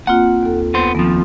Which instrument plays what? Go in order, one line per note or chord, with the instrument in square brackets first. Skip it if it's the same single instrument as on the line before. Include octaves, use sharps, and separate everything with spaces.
[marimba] A#3 C4 F4 [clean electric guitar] F#5
[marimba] D#2 A4
[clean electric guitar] B3 C5
[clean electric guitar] D#2 F3 [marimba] B3 C4